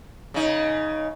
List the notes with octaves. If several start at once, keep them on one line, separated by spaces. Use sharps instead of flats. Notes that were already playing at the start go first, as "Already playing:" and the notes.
C#3 D#4